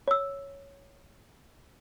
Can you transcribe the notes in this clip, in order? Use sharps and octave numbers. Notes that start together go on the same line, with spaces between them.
C#5 E6